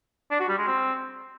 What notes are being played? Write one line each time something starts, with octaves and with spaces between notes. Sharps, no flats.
D4
F#4
G3
G#3
C4